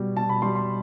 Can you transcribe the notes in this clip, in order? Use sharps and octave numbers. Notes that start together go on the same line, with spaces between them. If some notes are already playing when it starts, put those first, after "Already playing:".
Already playing: B2 G3
B2 A5
B5
G3 C6
C6